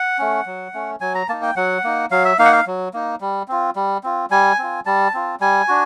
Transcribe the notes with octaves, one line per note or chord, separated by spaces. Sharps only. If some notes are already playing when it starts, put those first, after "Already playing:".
Already playing: F#5
A3 C#4
F#3
A3 C#4
F#3 G#5
A#5
A#3 D#4 A5
G5
F#3 F#5
A#3 D#4
F#3 F5
E5
A#3 D#4 F5
F#5
F5
F#3
A#3 D#4
G3
C4 F4
G3
C4 F4
G3 G#5
C4 F4
G3 A5
C4 F4
G3 G#5
D4 F#4